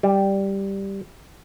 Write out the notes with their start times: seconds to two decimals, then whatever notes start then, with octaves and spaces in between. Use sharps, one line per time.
0.03 G3